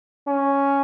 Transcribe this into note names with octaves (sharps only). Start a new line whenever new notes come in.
C#4